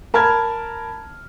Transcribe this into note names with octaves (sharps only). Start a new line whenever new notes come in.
A#4 A5 B5 F6 G#6